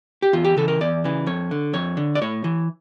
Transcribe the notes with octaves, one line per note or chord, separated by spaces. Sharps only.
G4
E2 F4
G4
C#3 E3 A4
A#4
E2 D5
C#3 E3
F2 C#5
D3
F2 C#5
D3
D5
A2 C#5
E3